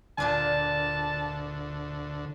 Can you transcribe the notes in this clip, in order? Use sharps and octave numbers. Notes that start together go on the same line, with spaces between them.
D2 A#2 D3 D4 F4 A5